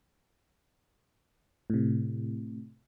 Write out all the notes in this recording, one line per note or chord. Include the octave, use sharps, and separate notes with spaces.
A2 C3